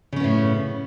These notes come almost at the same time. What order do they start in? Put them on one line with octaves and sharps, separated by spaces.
C#3 C#4 B3 A2